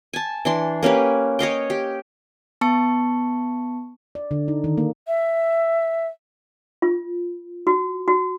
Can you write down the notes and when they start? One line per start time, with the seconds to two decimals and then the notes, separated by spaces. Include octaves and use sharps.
0.13 G#5 A5
0.45 E3 D4 C6
0.83 A#3 C#4 G4 B4
1.39 C#5 D#5 F5 G5
1.70 G4
2.61 B3 A5 C#6 C#7
4.15 D5
4.31 D3
4.48 D#4
4.64 D#3
4.77 A#3
5.07 E5
6.82 F4
7.67 F#4
8.08 F#4